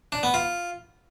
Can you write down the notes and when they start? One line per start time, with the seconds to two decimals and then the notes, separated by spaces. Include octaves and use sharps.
0.12 D4
0.23 B3
0.34 F4